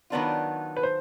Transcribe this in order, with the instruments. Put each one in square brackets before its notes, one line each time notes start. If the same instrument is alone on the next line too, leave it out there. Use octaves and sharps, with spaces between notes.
[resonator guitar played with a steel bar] D#3 F#3 B3 D4 F4
[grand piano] B4
C5